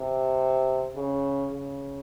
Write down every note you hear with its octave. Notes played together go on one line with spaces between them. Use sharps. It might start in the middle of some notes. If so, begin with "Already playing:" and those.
Already playing: C3
C#3
C#3